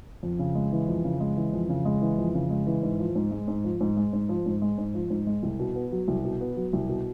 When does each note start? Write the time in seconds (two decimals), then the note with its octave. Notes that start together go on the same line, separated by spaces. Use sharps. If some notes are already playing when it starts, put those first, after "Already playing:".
0.23 F2
0.39 C#3
0.55 G#3
0.72 E3
0.88 F2
1.04 C#3
1.20 G#3
1.37 E3
1.53 F2
1.69 C#3
1.85 G#3
2.02 E3
2.18 F2
2.34 C#3
2.50 G#3
2.67 E3
2.83 G#2
2.99 F3
3.15 G#2
3.31 G#3
3.48 G#2
3.64 F3
3.81 G#2
3.97 G#3
4.13 G#2
4.29 F3
4.46 G#2
4.62 G#3
4.78 G#2
4.94 F3
5.10 G#2
5.27 G#3
5.43 C2
5.59 B2
5.76 B3
5.92 F#3
6.08 C2
6.24 B2
6.41 B3
6.57 F#3
6.73 C2
6.89 B2